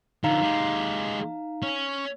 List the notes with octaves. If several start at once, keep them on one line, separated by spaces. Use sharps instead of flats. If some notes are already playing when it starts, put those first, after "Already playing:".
D3 F3 D#4 F5 A#5
G#3 G4
C#4